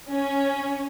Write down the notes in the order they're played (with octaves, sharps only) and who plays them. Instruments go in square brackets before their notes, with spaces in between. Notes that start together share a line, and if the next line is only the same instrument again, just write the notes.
[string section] C#4